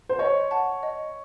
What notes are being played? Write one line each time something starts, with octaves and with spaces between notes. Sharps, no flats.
C5
C#5 D#5
F#5 A5
D#5